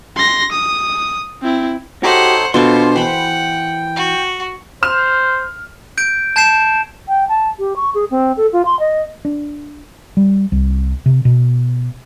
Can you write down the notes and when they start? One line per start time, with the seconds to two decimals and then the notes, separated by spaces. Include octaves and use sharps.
0.16 C6 A#6
0.52 D#6
1.42 C4 E4
2.03 D#4 F#4 G4 A4 C5 C#5 F#5
2.54 B2 D4 F4 A4 C5 C6 C#6
2.96 E3 C5 F#5 G5 B5
3.96 F#4
4.83 C5 F6 E7
5.98 G6 D7
6.36 A5 G6 G#6 C7 E7
7.08 G5
7.28 A5
7.59 G4
7.76 C#6
7.95 G#4
8.11 C4
8.37 A4
8.53 F4
8.65 C6
8.80 D#5
9.25 D4
10.17 G3
10.52 C2
11.06 C3
11.25 B2